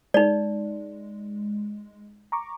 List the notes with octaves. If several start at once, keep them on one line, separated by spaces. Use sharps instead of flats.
G#3 D#4 D5
A#5 C#6 D6